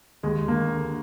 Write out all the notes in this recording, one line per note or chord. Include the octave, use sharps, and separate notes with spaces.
D#2 G#3
D3 A#3
D3